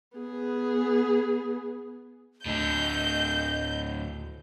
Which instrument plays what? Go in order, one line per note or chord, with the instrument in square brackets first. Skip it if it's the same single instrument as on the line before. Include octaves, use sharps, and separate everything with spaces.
[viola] B3 G#4
[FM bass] D2 [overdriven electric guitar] A2 D3 [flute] D#5 [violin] G6